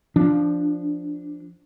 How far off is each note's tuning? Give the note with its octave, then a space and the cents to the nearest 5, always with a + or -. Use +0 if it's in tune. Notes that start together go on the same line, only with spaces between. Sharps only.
F3 -5 D4 +0